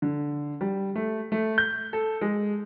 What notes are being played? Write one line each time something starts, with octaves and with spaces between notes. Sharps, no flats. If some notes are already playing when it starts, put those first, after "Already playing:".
D3
G3
A3
A3
G6
A4
G#3